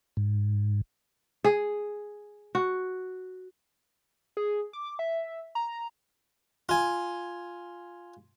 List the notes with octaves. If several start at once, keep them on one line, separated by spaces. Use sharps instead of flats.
G#2
G#4
F#4
G#4
D6
E5
A#5
F4 G#5